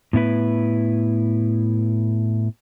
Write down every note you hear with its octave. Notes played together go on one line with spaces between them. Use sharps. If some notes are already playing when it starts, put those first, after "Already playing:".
A2 B3 E4 B4